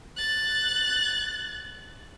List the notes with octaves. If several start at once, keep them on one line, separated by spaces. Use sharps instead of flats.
F#6 A6